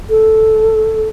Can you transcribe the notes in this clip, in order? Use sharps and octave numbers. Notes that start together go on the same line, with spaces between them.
A4